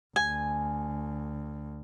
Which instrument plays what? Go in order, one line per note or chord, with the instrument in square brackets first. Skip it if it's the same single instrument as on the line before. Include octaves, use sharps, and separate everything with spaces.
[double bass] D2 [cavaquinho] G#5